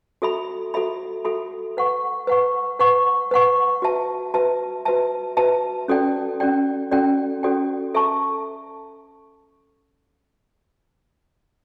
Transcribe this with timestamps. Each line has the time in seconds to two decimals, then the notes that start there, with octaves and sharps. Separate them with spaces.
0.22 F#4 A4 E5 B5
0.74 F#4 A4 E5 B5
1.25 F#4 A4 E5 B5
1.77 B4 F#5 C#6
2.27 B4 F#5 C#6
2.79 B4 F#5 C#6
3.31 B4 F#5 C#6
3.82 F#4 B4 E5 A5
4.34 F#4 B4 E5 A5
4.85 F#4 B4 E5 A5
5.37 F#4 B4 E5 A5
5.88 C#4 F#4 A4 D5 G5
6.40 C#4 F#4 A4 D5 G5
6.91 C#4 F#4 A4 D5 G5
7.43 C#4 F#4 A4 D5 G5
7.95 A4 E5 A5 C#6